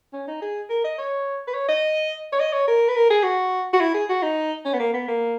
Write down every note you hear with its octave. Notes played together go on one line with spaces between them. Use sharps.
C#4
D#4
G#4
A#4
D#5
C#5
B4
C#5
D#5
C#5
D#5
C#5
A#4
B4
A#4
G#4
F#4
F#4
E4
G#4
F#4
D#4
C#4
B3
A#3
B3
A#3